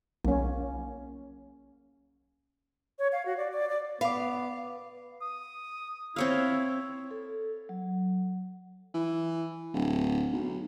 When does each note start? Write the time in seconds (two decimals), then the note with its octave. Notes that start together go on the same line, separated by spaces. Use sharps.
0.25 B1 A#3 C#4
2.99 C#5
3.12 F5
3.26 F#4
3.37 D5
3.51 D5
3.69 D5
4.01 B3 B4 F5 D6
5.22 D#6
6.16 C4 E4 C#5 F5
7.11 A4
7.69 F#3
8.94 E3
9.73 D1
10.32 B1